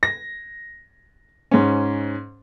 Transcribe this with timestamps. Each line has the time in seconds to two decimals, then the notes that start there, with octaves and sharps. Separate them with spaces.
0.03 A#6
1.51 G#2 C#4